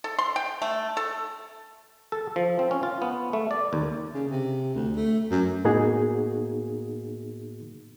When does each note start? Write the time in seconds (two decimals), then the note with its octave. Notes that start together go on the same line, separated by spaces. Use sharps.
0.04 A4
0.19 C6
0.36 G5
0.62 A3
0.97 A4
2.12 A4
2.36 F3
2.59 C4
2.71 C#4
2.83 F4
3.02 B3
3.33 A3
3.51 D5
3.73 D#2
4.14 C#3
4.31 C3
4.74 D2
4.96 A3
5.31 F#2
5.64 A2 A#3 B3 D#4 F#4 G#4